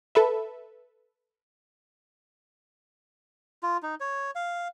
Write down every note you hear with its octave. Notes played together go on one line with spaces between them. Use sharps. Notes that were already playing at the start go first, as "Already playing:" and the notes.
A4 B4 E5
F4
D#4
C#5
F5